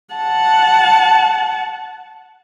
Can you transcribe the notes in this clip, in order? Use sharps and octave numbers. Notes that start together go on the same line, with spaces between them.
F#5 A5